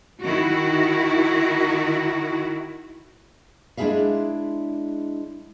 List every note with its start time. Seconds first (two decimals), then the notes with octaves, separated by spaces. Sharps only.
0.22 D#3 E4 F#4
3.77 G#3 D4 E4 G#4 E5 F5